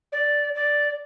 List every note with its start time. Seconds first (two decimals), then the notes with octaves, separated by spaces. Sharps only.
0.12 D5
0.55 D5